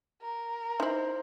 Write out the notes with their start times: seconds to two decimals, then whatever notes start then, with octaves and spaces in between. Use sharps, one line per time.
0.22 A#4
0.80 D#4 E4 C5 C6